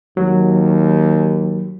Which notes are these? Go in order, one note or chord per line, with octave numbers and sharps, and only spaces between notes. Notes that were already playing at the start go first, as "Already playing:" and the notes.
D#2 F#3